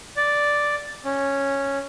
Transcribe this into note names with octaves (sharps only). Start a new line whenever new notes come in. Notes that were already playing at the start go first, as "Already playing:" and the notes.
D5
C#4